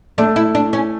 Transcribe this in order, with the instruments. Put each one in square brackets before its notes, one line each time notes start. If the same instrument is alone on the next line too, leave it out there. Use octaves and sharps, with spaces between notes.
[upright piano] A3 [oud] D4
[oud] E4
D4
C#4